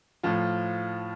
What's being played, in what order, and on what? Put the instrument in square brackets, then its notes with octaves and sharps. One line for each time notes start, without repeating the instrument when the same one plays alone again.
[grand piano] A2 F3 F4